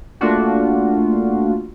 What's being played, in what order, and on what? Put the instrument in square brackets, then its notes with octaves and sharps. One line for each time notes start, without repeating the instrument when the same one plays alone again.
[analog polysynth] A3 A#3 D4 F4 F#4